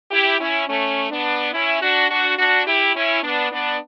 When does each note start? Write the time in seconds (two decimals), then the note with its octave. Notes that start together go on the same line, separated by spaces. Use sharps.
0.11 E4 G4
0.39 C#4 E4
0.68 A3 C#4
1.10 B3 D4
1.53 C#4 E4
1.81 D4 F#4
2.10 D4 F#4
2.38 D4 F#4
2.66 E4 G4
2.95 C#4 E4
3.23 B3 D4
3.52 B3 D4